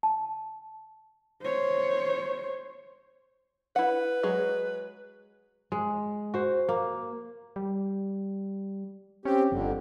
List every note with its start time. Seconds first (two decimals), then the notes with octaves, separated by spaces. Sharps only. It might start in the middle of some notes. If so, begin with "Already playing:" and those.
0.03 A5
1.42 C5 C#5
3.76 E4 B4 F#5
4.23 F#3 G#3 G#4
5.72 G#3
6.34 F#4 C5
6.69 A#3
7.56 G3
9.25 C4 C#4 G4
9.52 G1 F2 D3